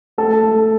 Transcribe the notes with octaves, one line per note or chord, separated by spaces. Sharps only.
A3 A4
A3